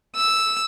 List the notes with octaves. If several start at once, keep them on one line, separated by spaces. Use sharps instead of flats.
E6